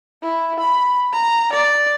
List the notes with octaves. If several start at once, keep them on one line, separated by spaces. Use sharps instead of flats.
E4
B5
A#5
D5